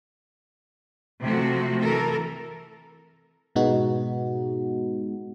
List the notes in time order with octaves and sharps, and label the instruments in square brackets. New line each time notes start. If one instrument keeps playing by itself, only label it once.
[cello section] C3 F3 A3 F#4
E3 A4 A#4
[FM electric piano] G#2 B2 G#3 B3 D#4 F#4